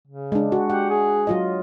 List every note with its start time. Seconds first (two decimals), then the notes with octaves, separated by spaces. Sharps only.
0.08 C#3
0.32 G#3 D4
0.52 F#4
0.70 G4 F#5
0.90 G#4
1.27 F#3 F4 D#5